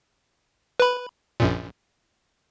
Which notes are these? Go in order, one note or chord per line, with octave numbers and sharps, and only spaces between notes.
B4 B5
A#1 F#2 A#2